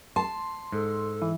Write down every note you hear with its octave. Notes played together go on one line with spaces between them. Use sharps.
A5 C6
G#2 A4
E3